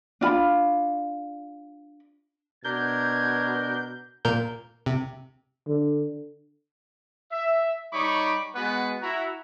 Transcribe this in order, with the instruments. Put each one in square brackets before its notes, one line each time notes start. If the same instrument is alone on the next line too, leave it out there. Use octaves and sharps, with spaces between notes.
[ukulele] D4 F4 B5
[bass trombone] B2 [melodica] D4 A#4 [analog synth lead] G6 [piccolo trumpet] G#6
[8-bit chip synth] A#2 A#4 G6
C3
[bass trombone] D3
[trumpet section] E5
G3 D#4 C#5 B5 C#6 D6
G#3 B3 F#4 B4 F#5 G#5
E4 F#4 A#5